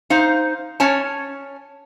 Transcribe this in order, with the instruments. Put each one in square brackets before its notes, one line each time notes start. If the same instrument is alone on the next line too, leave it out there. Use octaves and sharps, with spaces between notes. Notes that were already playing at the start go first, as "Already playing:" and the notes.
[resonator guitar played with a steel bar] D#4 C5 F5
C#4 C#5 G#5 A5